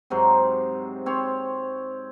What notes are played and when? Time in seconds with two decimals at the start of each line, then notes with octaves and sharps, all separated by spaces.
0.10 G#2 C3 F#3 C5
1.06 C4 C#5 C6